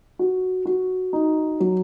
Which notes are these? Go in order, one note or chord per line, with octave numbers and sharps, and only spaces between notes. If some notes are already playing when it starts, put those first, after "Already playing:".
F#4
F#4
D#4
F#3